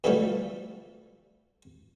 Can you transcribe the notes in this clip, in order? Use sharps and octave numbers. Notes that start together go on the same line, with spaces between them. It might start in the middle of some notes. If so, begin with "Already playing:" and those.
B2 D3 E3 F3 G3 A3